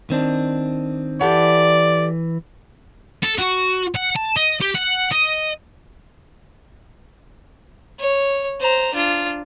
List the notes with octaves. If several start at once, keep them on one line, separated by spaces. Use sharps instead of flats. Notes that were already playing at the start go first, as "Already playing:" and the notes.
D#3 C4 D4
E3 G4 A4 D5 F#5
A4
F#4
F#5
A5
D#5
G4
F#5
D#5
C#5
C5 A#5
D4 F4